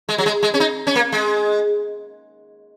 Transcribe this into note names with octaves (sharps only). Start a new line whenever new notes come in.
G#3
F#3
G#3
G#3
C#4
D#4
C#4
A#3
G#3